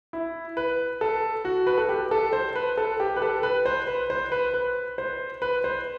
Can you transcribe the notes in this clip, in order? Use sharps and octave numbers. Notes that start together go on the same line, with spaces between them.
E4
B4
A4
F#4
B4
A4
G4
A4
C5
B4
A4
G4
B4
A4
B4
C5
B4
C5
B4
B4
C5
B4
C5